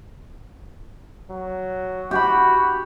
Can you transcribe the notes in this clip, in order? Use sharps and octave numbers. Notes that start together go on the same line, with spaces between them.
F#3
F#4 G4 G5 B5